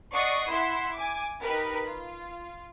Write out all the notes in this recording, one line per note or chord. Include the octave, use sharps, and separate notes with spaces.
D5 D#5 F#5 C#6 D#6 C7
E4 E5 F#5 C6
G#5 D6
D#4 G4 A#4 B4 B5
F4